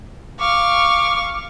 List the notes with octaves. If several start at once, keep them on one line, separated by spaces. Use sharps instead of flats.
F5 C#6 D6